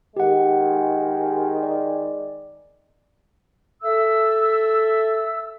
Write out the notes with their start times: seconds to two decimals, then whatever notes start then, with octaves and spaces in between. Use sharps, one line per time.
0.16 D#3 G#3 G4 F#5
1.63 D5
3.82 A4 E5 E6